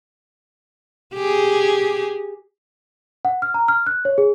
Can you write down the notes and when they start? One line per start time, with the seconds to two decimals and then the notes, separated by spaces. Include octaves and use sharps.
1.14 G4 G#4
3.25 F#5
3.42 F6
3.54 A#5
3.68 F6
3.87 F#6
4.05 C#5
4.18 G#4